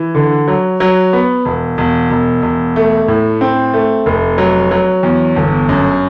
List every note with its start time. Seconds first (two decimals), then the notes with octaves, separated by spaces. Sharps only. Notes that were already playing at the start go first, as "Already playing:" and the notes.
Already playing: E3
0.15 D3
0.48 F#3
0.80 F#3
1.13 B3
1.45 E1
1.78 E1
2.10 E1
2.42 E1
2.76 A3
3.08 A2
3.41 C4
3.74 A3
4.06 F1
4.38 F#3
4.71 F#3
5.03 E2
5.36 G1
5.69 F#2